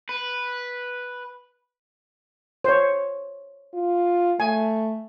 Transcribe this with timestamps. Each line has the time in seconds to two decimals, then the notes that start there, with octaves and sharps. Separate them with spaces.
0.09 B4
2.64 C5 C#5
3.73 F4
4.40 A3 G#5